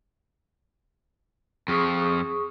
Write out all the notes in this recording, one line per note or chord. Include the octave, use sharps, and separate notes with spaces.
F2 F3 G#4 C#6 D#6